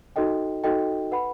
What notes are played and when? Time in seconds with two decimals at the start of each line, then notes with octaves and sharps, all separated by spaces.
0.16 D#4 F#4 A4 D#5 G5
0.64 D#4 F#4 A4 D#5 G5
1.12 B4 F#5 B5